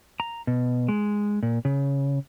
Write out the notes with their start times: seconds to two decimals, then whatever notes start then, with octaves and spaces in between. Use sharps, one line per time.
0.20 A#5
0.47 B2
0.89 G#3
1.43 A#2
1.65 C#3